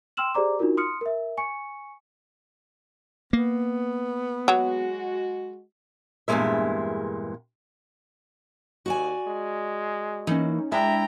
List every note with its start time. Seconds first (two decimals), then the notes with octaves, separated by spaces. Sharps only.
0.17 G5 C6 E6 F6 E7 F#7
0.34 G4 G#4 C5 D5 A#5 D6
0.59 D4 D#4 F4 F#4 A#4
0.77 C6 D#6 F6 C#7
1.01 A#4 E5
1.38 G#5 C#6 C#7
3.33 A#3 B3
4.48 F#3 G#3 F#4
6.28 E2 G2 A#2 F#3 G#3 E5
8.86 D#2 F#4 D5 G#5
9.27 G#3
10.27 E3 A#3 C#4 D#4
10.72 G#3 D4 E4 E5 G5 A#5